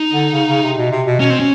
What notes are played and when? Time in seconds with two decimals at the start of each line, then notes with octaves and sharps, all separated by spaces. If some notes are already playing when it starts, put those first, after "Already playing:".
Already playing: D#4
0.12 D3
0.33 C#3
0.49 C#3
0.63 C3
0.78 B2
0.91 C3
1.06 B2
1.20 B2 C#4
1.30 C4
1.40 C#4